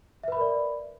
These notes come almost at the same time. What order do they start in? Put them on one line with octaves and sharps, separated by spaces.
E5 B4 B5 A#4 D5